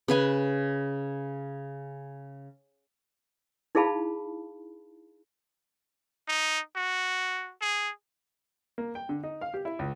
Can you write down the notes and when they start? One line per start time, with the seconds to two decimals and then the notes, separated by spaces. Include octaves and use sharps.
0.08 C#3 B4 G#5
3.75 D#4 E4 G#4 F5 A5 B5
6.28 D#4
6.76 F#4
7.61 G#4
8.78 A#3
8.95 G5
9.09 D3
9.23 D#4
9.41 F5
9.54 G4
9.65 E4
9.79 C#2